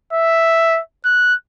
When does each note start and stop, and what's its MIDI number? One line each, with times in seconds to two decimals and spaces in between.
0.13 0.80 76
1.05 1.34 90